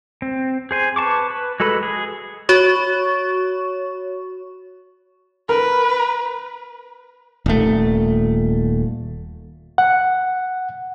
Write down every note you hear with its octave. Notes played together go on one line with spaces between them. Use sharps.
C4
G#4 C5 G#5
B4 A5 C#6 D6
B4
G#3 F#4 A4 B4 B5
G#4
F#4 C#5 C#6
A#4 B4
D#1 A3
F#5